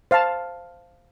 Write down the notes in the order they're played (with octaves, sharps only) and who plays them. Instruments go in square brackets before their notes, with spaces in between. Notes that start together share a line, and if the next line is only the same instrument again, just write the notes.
[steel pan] C5 F5 A5